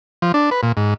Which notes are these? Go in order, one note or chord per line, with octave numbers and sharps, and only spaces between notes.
F3
D4
B4
A#2
G#2